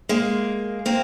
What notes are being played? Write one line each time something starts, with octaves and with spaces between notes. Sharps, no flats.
G#3 A#3
A#3 C4